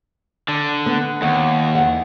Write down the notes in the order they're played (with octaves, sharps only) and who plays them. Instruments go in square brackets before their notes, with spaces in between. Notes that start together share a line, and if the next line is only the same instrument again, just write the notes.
[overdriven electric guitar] D3
[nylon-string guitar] B3
[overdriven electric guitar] D#2 [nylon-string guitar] F#5
[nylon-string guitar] E2 F#5